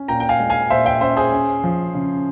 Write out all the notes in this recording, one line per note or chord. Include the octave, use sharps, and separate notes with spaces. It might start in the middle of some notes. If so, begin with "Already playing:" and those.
Already playing: C#4
A#2 G5 A#5
G5
F5 G#5
G#3
F5 G#5
A#2 C5 E5
E5 G5
C#4 C5 E5
G#4 C5
C#4
F3
C#3